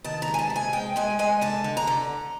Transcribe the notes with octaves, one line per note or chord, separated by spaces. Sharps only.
D#3 A5
A#5
G#3
G#5
A5
C3
G#5
G#3 G5
G#3 G#5
G#3 G#5
D3 A5
D3
A#5
D3